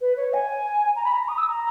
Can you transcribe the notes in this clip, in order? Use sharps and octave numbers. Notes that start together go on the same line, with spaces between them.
B4
C#5
G#5
A#5
B5
A#5
D#6
E6
A#5